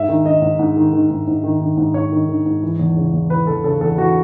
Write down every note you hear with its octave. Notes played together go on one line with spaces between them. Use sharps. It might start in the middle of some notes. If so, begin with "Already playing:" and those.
Already playing: G#2 E5
D#3
D#3 D#5
G#2
G#2
D#3
D#3
G#2
G#2
D#3
D#3
G#2
G#2 C#5
D#3
D#3
G#2
E3
E2
C#3
E2
E3 B4
E2 A4
C#3 A4
E2 A4
E3 F#4